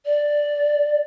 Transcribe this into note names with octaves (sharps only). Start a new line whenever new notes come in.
D5